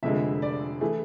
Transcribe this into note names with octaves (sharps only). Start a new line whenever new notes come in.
F1 F2 D3 G#3 E5
D5
E3 A3 G#4